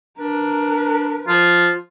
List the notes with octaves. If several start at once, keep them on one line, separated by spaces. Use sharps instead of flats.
D4 A#4 B4
F3 F4